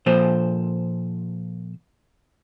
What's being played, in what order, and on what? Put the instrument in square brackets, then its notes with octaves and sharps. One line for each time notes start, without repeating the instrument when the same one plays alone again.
[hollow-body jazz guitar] A#2 F3 A4 C5